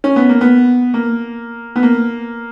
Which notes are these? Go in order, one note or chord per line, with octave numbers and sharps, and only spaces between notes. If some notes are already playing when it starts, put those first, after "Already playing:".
C#4
B3
A#3
B3
A#3
B3
A#3